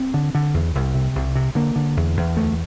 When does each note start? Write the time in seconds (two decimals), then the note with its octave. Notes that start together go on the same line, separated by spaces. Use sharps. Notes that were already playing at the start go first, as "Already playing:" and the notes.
Already playing: C4
0.14 D3
0.35 D3
0.54 E2
0.75 C2
0.95 C3
1.15 C2
1.35 C3
1.55 D3 A#3
1.76 D3
1.97 E2
2.17 E2
2.36 D2 A3